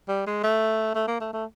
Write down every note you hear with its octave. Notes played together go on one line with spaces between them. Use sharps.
G3
G#3
A3
A3
A#3
A3
A3